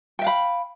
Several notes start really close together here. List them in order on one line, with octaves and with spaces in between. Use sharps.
G5 E5 F5 B5